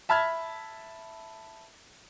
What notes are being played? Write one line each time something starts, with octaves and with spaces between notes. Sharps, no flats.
E5 A5 B5 F6 G#6